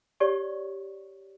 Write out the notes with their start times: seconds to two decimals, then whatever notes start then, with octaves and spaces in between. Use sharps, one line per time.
0.20 G4 C#5 D5 C#6